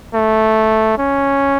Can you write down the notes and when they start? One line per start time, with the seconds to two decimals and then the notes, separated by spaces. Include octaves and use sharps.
0.14 A3
0.98 C#4